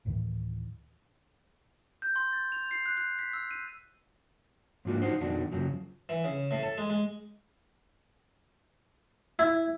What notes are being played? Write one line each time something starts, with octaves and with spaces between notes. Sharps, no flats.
D2 A2 D#3 E3
G6
C6
A6
F7
C7
F#6
F#6
B6
E6
D#7
G#2 F3 A#3 D4 F4 F#4
D#4 F4 F#4 C5
F2 B2 D#3 D4 F#4
F#2 C#3 F3 F#3
E3
C#3
A2
A4
G#3
G#3
E4